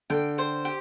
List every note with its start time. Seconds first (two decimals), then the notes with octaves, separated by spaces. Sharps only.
0.10 D3 G5
0.38 C5
0.65 G4